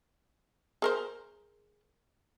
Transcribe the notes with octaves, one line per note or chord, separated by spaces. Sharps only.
G#4 A#4 C5